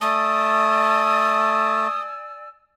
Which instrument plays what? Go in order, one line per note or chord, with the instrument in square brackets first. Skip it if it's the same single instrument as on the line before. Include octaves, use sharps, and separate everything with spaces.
[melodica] A3 A5 [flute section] D5 G#5 E6 [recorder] D#6